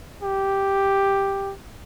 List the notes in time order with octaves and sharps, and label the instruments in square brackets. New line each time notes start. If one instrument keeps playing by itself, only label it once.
[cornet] G4